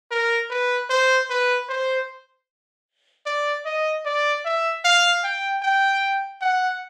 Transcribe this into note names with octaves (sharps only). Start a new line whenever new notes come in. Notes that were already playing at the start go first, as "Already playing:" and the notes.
A#4
B4
C5
B4
C5
D5
D#5
D5
E5
F5
G5
G5
F#5